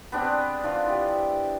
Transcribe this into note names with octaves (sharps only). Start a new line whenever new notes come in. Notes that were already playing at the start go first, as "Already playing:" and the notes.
B3 C4 D4 G#4
F3 D4 F4
E4 G4